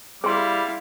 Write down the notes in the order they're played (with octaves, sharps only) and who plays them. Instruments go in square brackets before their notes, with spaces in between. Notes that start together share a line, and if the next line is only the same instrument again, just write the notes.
[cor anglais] G3 [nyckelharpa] E4 F5 [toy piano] G#4 C6